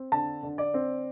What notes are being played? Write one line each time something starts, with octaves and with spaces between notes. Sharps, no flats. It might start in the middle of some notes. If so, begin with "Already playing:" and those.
Already playing: C4
D3 A5
D3
D5
C4